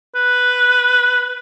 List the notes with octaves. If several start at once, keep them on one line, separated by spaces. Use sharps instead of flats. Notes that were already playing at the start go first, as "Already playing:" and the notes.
B4